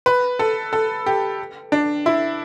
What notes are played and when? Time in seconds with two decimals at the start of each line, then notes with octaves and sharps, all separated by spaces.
0.06 B4
0.39 A4
0.73 A4
1.06 G4
1.72 D4
2.06 E4